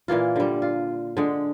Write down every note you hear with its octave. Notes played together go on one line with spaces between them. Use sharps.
A#2 E3 A#3 F4
D3 G3
F4
D3 G#3